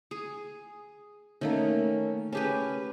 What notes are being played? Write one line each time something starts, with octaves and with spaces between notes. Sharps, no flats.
G#4
D#3 A3 A#3 C#4
C#4 G4 G#4 B4 A5